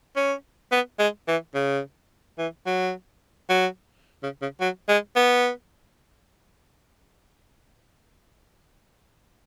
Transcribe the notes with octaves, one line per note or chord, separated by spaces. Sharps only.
C#4
B3
G#3
E3
C#3
E3
F#3
F#3
C#3
C#3
F#3
G#3
B3